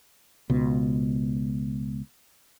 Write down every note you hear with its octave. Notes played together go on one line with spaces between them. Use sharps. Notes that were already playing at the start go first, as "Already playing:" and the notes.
C#2 B2